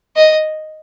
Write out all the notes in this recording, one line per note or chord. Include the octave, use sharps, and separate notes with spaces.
D#5